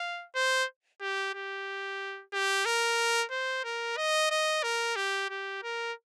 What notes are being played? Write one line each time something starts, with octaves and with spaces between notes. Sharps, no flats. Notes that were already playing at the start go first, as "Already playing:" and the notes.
Already playing: F5
C5
G4
G4
G4
A#4
C5
A#4
D#5
D#5
A#4
G4
G4
A#4